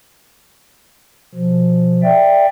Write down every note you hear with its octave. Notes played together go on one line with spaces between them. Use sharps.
B2 F3
D5 E5 G5